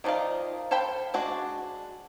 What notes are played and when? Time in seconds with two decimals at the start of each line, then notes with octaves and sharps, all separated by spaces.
0.04 D#3 F3 D#4 D5 F5
0.71 A4 C5 F5 G5 B5
1.14 G#3 D4 F#4